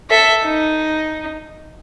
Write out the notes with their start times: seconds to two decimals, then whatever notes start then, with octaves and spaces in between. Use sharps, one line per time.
0.10 A4 E5
0.44 D#4